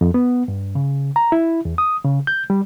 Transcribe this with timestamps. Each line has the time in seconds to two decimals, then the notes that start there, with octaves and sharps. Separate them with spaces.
0.01 F2
0.14 B3
0.48 G2
0.75 C#3
1.16 A#5
1.32 E4
1.65 E2
1.78 D#6
2.04 C#3
2.27 G6
2.50 G3